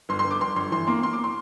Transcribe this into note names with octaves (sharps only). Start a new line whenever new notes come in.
G1 C6
C6
G1
D6
G1 C6
G1 C6
E3 C6
A#3 C6
A#3 C6
D6
A#3
C6